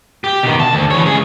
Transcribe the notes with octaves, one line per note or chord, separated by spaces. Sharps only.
G4
B2 D#3
A5
D2
E3 C#5
C#2 G#4